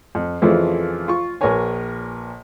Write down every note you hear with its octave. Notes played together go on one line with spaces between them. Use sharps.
F2
F2 C#3 E3 F3 A3
F4 C#6
A#1 A#2 A#4 B4 C#5 G#5